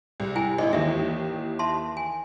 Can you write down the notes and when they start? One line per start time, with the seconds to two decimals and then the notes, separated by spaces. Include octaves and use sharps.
0.20 C2
0.36 E4 G5 G#5
0.58 G#1 E4 D#5
0.73 D#2 D#3 E3 E5
1.59 E5 A5 C6
1.97 G#5